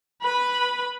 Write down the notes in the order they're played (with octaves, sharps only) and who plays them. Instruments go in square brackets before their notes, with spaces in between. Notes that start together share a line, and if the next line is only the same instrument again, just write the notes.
[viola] B4 B5